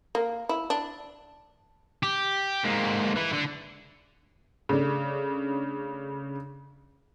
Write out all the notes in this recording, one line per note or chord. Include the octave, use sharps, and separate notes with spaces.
A#3
E4
D4
G4
G#2 A#3
E3 E4
D3
C#3 A3 D4